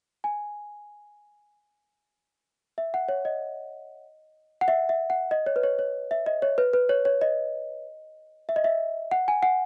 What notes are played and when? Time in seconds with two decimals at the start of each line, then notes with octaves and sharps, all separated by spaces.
0.24 G#5
2.78 E5
2.94 F#5
3.09 C#5
3.25 D#5
4.61 F#5
4.68 E5
4.89 E5
5.10 F#5
5.31 D#5
5.46 C#5
5.56 B4
5.63 C#5
5.79 C#5
6.11 E5
6.26 D#5
6.42 C#5
6.58 B4
6.73 B4
6.89 C#5
7.05 C#5
7.21 D#5
8.49 E5
8.56 D#5
8.64 E5
9.11 F#5
9.28 G#5
9.43 F#5